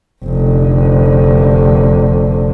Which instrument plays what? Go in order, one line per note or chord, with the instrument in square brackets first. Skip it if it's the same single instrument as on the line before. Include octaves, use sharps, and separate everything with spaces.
[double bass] F1 D3